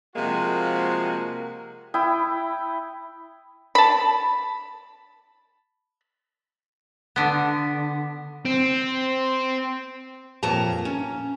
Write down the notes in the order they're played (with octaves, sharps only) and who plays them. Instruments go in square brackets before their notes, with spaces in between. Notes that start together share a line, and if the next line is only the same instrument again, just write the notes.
[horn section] C3 F3 G#3 A#3 F#4
[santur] E4 G5 D#6
[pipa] A5 B5
[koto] D3 B3
[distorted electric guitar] C4
[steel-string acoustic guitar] F2 A#2 F#3 A5 A#5
C#4